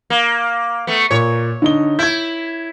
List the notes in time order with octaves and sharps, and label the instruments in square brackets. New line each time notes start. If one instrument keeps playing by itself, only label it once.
[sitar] A#3
A3 B3
[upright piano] A#2 [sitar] C#5
[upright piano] D3 D#4 G7
[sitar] E4 [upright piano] G6 G#6